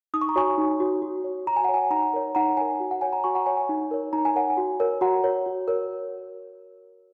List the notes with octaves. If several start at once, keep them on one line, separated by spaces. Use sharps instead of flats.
D#4 D#6
C#6
A#5
F#4 C#5 G#5 C#6
D#4
F#4 C#5
F#4
C#5
F#4 A#5
G#5
F#5
C#5 G#5
D#4 F#5 A#5
A#4 C#5
D#4 F#5 A#5
A#4 C#5 G#5
F#4
F#5
C#5 G#5
F#5 A#5
F#4 G#5 C#6
F#5 A#5
C#5 G#5
G#5
D#4
A#4 C#5
D#4 A#5
G#5
A#4 C#5 F#5
G#5
F#4
A#4 C#5
F#4 F#5 A#5
A#4 C#5
F#4
A#4 C#5